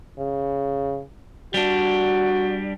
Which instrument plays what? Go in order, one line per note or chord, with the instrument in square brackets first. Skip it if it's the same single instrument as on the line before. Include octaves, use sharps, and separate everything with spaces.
[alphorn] C#3
[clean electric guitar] G3 D4 [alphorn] F#4